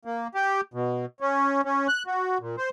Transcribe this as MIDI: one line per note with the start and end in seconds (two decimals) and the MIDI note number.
0.05 0.28 58
0.35 0.61 67
0.74 1.06 47
1.21 1.61 61
1.65 1.87 61
1.88 2.03 90
2.07 2.38 66
2.40 2.56 46
2.58 2.70 72